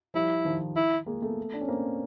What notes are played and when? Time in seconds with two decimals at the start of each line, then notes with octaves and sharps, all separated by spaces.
0.14 F3 G3 E4
0.45 D#3 F3
0.76 E4
1.06 G#3 A#3
1.22 A3 B3
1.54 D4
1.61 C#4
1.68 A#3 C4